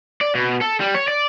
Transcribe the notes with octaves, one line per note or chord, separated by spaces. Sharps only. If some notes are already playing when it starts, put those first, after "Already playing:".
D5
B2
A4
G3
C#5
D5